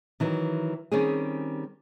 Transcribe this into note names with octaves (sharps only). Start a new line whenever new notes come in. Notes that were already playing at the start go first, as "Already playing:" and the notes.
D#3 E3 F#3
D#3 G3 C4 C#4 G4 G#4